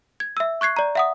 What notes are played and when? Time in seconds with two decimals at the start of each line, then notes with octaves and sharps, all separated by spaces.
0.20 G#6
0.37 E5 E6
0.61 C#6 F#6 G#6 C7
0.76 D5 A#5
0.95 E5 F#5 D#6